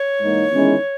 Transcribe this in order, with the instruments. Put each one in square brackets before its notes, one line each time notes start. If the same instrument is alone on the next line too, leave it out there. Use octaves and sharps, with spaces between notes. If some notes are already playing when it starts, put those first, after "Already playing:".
Already playing: [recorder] C#5
[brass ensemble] G#2 E3 A#3 D#4
E2 D#3 G#3 C#4 E4